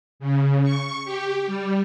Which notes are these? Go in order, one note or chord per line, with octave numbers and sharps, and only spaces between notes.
C#3
C#6
G4
G3